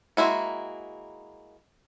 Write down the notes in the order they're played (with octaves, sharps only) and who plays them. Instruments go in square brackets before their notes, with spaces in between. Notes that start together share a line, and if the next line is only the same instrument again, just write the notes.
[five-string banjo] G#3 A#3 E4 F#4